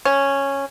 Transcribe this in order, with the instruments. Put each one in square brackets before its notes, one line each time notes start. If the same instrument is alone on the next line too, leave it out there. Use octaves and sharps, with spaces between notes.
[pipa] C#4